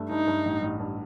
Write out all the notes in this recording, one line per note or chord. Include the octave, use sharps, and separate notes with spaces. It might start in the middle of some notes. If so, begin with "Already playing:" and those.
Already playing: G2 A3
G2 D#4
G2
A1
A1
G2